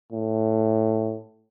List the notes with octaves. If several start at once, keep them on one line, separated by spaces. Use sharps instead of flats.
A2